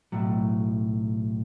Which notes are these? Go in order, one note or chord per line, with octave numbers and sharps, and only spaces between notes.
B1 A2 F#3